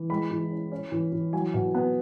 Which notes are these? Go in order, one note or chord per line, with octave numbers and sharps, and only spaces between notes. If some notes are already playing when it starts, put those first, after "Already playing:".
Already playing: E3
G#3 B5
E3
C#4
C#4
E3
E3
F#3 G#5
B2
B3